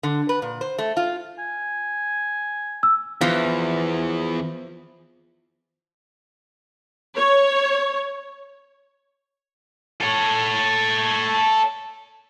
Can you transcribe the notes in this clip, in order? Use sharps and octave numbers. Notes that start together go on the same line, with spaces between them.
D3
B4
A#2
C5
A3
F4
G#5
E6
E2 E3 F3
C#5
A4 C#5